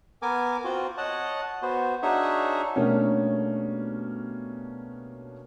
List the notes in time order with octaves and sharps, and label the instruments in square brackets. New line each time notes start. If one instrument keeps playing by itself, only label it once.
[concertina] B3 A#4 G#5 D6
C4 F4 F#4
C#5 D#5 F#5 A5
B3 F#4 C5
D4 D#4 F#4 G#4 C#5 E5
[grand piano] B2 G3 A3 A#3 C#4 D4